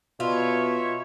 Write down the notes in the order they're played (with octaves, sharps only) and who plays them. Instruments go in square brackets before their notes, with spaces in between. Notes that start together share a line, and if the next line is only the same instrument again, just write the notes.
[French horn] B2 [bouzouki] F4 [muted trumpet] C#5 [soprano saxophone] E5